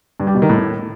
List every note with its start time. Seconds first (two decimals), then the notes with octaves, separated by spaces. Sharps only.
0.20 G2
0.27 G3
0.35 B2
0.42 D#3
0.49 A2